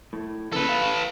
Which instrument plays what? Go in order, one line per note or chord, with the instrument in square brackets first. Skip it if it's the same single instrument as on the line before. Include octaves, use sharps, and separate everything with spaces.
[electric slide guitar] A2
[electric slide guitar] A#2 C#3 E3 [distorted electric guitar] A4 B4
[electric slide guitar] F5